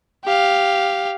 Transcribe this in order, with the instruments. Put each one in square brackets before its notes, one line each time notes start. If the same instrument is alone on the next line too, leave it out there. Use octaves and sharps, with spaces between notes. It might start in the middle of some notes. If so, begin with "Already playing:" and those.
[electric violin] G4 F5